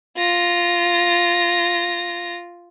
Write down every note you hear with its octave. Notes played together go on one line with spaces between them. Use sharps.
F4 A#6